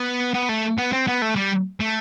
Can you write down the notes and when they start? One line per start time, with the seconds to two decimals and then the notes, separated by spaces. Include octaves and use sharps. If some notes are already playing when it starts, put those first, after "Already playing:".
Already playing: B3
0.34 B3
0.49 A3
0.78 B3
0.92 C4
1.07 B3
1.22 A3
1.36 G3
1.80 A3